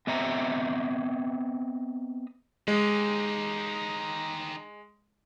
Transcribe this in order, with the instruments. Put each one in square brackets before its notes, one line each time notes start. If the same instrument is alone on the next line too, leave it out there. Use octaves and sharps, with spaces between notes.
[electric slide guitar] B3 C4 D#5 E5 A#5
[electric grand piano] G#3 [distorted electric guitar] D#4 G4